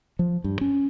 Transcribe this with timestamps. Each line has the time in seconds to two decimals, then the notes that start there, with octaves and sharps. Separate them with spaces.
0.19 F3
0.44 G2
0.61 C#4